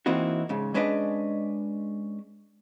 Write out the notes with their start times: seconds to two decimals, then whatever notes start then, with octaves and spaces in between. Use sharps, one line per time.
0.06 E3 A#3 C4 D#4 E4 F#4
0.49 G#2 C#3
0.74 G#3 C#4 D4 B4 D5 D#5